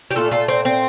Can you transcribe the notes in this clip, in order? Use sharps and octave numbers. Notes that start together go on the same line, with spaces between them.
G4
A#2 A3 F4 A4
F4 A4
C4
C4